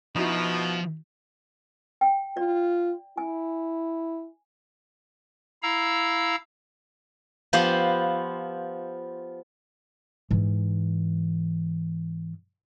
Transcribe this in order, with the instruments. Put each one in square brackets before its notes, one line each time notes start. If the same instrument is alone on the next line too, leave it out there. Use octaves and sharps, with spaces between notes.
[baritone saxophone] B2 [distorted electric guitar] F3 [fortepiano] D#4 E4 F#4
[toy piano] G5
[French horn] F4 [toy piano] D5
[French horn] E4 [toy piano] G#5
[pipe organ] E4 F5 A#5 E6
[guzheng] F3 B3 F4 G4 C5
[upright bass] G#2 E3